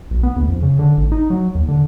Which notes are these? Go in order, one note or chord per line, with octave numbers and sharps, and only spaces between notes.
B1
B3
D2
F2
C#3
D3
G#1
D#4
F#3
D#2
D3